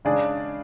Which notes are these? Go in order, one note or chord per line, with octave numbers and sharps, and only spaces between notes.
C#3 G#3 D4 G#4 D5